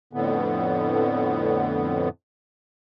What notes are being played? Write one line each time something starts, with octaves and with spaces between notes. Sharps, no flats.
F2 A2 D3 B3